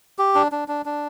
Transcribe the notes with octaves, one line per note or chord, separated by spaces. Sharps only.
G4
D4
D4
D4
D4